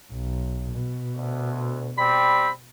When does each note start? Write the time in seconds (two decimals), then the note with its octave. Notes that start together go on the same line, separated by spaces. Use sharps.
0.12 B1
0.72 B2
1.17 D2
1.98 G3 C4 B5